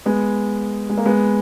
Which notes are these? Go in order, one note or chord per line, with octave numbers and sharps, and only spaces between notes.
G#3 B3
G#3
A#3
G#3 B3